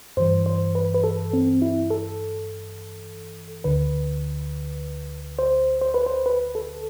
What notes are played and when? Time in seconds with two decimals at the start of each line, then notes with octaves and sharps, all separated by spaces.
0.17 G2 E3 C5
0.46 C5
0.75 B4
0.94 B4
1.04 A4
1.33 C4
1.62 E4
1.90 A4
3.64 D2 D3 B4
5.39 C5
5.81 C5
5.94 B4
6.06 C5
6.26 B4
6.55 A4